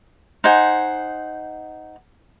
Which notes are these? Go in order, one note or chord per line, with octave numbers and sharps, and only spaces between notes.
D#4 C5 F#5 G#5